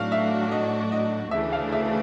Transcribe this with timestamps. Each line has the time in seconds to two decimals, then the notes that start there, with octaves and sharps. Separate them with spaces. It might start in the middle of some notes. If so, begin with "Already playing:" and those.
Already playing: A2 F#3 A3 D4 F#4 F5
0.12 E5
0.52 D#5
0.92 D#5
1.31 D2 C#3 E3 A3 D4 E5
1.53 F5
1.72 E5